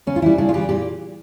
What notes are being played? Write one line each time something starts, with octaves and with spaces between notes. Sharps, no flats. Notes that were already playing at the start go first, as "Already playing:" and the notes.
C#3 C#4
F4
E3 G3 E4
C#3 D4
F4
E3 G3 G4
A#2 G4